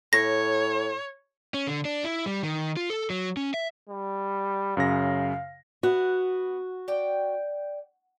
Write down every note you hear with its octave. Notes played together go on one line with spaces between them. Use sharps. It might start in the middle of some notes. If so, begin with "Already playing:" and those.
A2 C#5 A#6
C#4
D3
D4
E4
G3
D#3
F4
A4
F#3
C#4
E5
G3
F#2 C#3 F5 A#6
B3 F#4
D5 G5